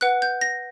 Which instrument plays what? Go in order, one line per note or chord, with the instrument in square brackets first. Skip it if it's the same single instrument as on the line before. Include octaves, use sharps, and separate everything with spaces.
[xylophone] B4 F#5 F#6
G6
A#6